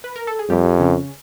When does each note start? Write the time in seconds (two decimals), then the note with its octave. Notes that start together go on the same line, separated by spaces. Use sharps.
0.04 B4
0.16 A#4
0.27 A4
0.39 G#4
0.49 F2 G3 G4
0.80 C#3 C#4